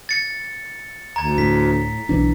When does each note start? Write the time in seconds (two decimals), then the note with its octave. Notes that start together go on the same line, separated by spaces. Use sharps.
0.09 A6 C#7
1.16 D2 A#5 G#6
1.38 A2 B6
2.09 B1 E3 D4